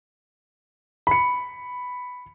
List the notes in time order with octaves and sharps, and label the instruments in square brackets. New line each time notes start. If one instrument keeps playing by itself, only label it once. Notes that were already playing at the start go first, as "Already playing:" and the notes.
[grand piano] B5 C#7